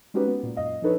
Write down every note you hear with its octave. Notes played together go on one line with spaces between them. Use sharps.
G#3 C#4 D#4 F#4 G4 B4
B3
A#2
F#2 A#2 D#5 F5
F3 D4 D#4 A4 B4 C#5